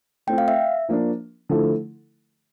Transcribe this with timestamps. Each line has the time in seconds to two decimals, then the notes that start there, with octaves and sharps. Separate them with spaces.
0.27 A3 C4 F4 G5
0.38 F5
0.48 E5
0.89 F3 A#3 D4
1.49 D3 F3 A3 E4 A4